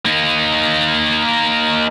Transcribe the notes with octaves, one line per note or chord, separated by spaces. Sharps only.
A#3 D#4